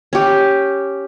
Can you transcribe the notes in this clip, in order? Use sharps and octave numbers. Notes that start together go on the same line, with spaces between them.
C#4 G4